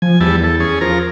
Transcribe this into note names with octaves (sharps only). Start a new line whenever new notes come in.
F3 G#5
E2 G3 E4 A5
A4
C#4 G#4
F3 F4 A#4